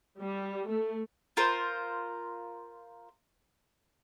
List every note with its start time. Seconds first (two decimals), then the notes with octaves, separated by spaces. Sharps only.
0.17 G3
0.65 A3
1.37 F4 A#4 C5